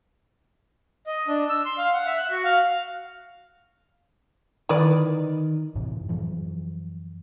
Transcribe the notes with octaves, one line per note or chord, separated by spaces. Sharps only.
D#5
D4
E6
C6
F5
F#5
E5
F#6
F#4
F5
D#3 E4 B4 D5
F#2 A2 C3 E3
F#2 E3 F3